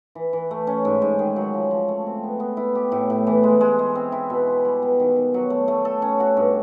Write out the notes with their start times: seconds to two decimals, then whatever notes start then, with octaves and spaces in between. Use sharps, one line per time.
0.15 E3
0.33 E3
0.51 A3
0.67 C#4
0.85 G#2
1.02 G#2
1.19 D#3
1.36 F#3
1.53 F3
1.71 F3
1.88 A3
2.06 C4
2.24 B3
2.40 B3
2.57 E4
2.75 G4
2.92 A2
3.10 A2
3.27 E3
3.44 G#3
3.61 G#3
3.79 G#3
3.95 C4
4.12 E4
4.30 B2
4.47 E4
4.65 G3
4.82 B3
5.00 D#3
5.16 D#3
5.34 F#3
5.50 A3
5.68 A3
5.85 A4
6.02 C#4
6.20 F#4
6.37 G2